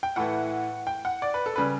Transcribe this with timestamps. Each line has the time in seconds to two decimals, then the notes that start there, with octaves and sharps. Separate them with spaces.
0.03 G5
0.16 A2 E3 A3 F#5
0.87 G5
1.05 F#5
1.22 D5
1.34 B4
1.46 A4
1.56 C#3 G3 B4